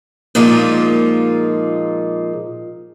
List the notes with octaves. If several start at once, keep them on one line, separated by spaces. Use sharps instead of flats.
A#2 F3 G#3 A#3 D#4 F4